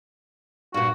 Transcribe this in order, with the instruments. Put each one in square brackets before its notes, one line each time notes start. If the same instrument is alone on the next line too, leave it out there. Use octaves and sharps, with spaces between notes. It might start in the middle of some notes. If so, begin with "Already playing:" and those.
[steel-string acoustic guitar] G2 A#2 [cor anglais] F#4